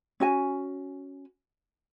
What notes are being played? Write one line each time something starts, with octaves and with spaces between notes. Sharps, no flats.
C#4 F#4 G#5